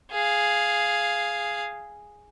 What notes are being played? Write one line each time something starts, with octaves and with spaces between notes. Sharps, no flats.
G#4 F5